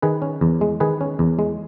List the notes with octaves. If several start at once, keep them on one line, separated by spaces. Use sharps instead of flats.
D#3 G#4 B4
C#4
E2
G#3
D#3 G#4 B4
C#4
E2
G#3